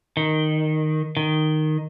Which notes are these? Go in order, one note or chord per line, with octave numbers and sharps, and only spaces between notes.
D#3
D#3